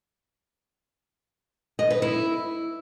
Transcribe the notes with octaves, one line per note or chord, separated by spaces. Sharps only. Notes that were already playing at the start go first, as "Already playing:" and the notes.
D#5
B4
E4